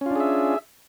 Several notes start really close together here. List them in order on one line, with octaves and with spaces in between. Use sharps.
C#4 F4 D4 G#4 E5